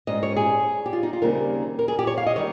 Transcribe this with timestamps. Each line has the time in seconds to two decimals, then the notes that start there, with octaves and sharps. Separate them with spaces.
0.07 G#2 G3 C#4 D#5
0.23 C#5
0.36 G#4
0.86 G4
0.93 F4
1.03 D#4
1.13 F4
1.22 D#2 C#3 G3 C4 D#4 A#4
1.79 A#4
1.88 G#4
1.99 G4
2.07 C#5
2.18 F5
2.27 D#5
2.36 D#3 G3 C#5